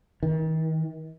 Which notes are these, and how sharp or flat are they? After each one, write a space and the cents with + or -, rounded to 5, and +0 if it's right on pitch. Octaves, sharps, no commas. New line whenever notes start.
D#3 +40